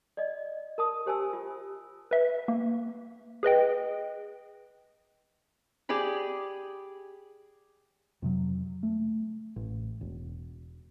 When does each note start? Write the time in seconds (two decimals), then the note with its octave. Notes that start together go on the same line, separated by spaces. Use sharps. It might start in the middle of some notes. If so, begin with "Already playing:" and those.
0.17 D5 D#5
0.78 A#4 A5 D#6
1.06 G4 C5 G#5 A5 E6
1.33 F4
2.11 B4 E5
2.48 A#3
3.43 G#4 B4 D#5 G5
5.89 G4 G#4 D5 B5
8.22 F2 C3 F#3
8.83 A3
9.56 A1
10.01 E1